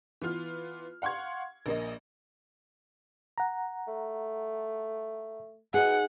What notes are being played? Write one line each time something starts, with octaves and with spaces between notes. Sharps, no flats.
E3 B3 F4 F6
F5 F#5 C6 C#6 G#6
A#1 A#3 D#5
F#5 A#5
A3
B2 D#4 G#4 F#5